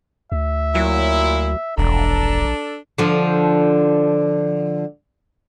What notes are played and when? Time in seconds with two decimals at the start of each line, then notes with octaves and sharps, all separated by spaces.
0.32 D2 E5
0.75 A#2 F#3 E4
1.78 E1 A#1 D4 A4 A#5
2.98 D3 F3